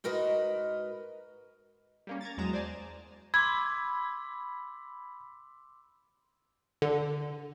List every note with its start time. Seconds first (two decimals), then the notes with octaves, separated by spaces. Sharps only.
0.04 G#2 F#4 A#4 B4 D#5
2.07 G3 A#3 C#4
2.21 A#5 G#6 A6
2.38 E2 F#3 G#3 A#5 D#6 E7
2.53 C5 D5 G#5 A5
3.34 B5 C6 D6 E6 G#6
6.82 D3